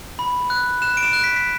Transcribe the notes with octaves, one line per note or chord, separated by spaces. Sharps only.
B5
F#6
F#6 E7
D7
E7
F#6
B6
B6